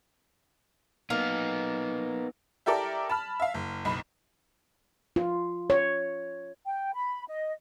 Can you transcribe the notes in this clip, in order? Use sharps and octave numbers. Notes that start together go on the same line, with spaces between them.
A#3 B3 D#4
E4 G4 A4 A#4 D5
A5 B5 F6
E5 F5
F#1
F#1 B1 B5
F4
C#5
G5
B5
D#5